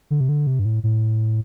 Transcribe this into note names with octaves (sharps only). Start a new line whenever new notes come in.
D3
C3
D3
C3
G2
A2
A2